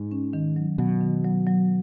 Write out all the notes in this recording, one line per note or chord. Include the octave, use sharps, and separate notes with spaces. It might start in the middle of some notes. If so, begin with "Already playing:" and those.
Already playing: G#2
C#4
D#3
F#3
B2 F#3
D#3
F#3
F#3